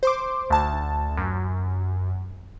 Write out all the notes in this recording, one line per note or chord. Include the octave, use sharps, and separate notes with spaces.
C5 C6 D6
D2 A5
F#2